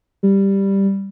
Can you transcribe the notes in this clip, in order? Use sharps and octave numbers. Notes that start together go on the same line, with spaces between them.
G3